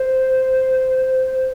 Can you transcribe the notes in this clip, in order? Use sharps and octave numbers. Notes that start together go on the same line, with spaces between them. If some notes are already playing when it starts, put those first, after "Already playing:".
Already playing: C5